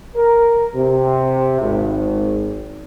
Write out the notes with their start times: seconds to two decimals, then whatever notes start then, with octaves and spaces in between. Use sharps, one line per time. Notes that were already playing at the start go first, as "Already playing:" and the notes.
0.15 A#4
0.75 C3
1.60 G#1